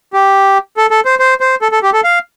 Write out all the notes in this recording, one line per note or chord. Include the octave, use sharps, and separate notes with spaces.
G4
A4
A4
C5
C5
C5
A4
A4
G4
A4
F5